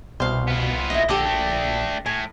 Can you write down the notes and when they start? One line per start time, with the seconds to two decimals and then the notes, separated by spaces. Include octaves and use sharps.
0.20 C2 B2 C5 F5
0.48 B3 F4
0.90 A#1 E4 D#5 A#6
1.09 D3 G4 A4 D6 D#6
1.25 A3 D4
2.06 A2 G#5